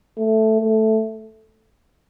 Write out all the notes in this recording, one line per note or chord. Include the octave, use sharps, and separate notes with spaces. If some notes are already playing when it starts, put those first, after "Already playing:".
A3
A3